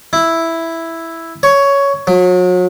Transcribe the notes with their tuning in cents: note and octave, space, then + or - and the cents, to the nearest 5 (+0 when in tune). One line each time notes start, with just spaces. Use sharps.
E4 +0
C#5 +10
F#3 -35